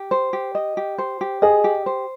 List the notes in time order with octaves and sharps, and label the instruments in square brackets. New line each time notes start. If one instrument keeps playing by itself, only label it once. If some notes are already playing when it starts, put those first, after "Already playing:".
Already playing: [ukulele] G4
C5
G4
D#5
G4
C5
G4
[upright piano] G#4 [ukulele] D#5
[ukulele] G4
C5